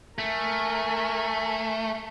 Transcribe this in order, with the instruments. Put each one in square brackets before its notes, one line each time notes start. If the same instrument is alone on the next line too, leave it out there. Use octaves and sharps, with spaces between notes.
[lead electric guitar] A3 [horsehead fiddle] A#4 G#5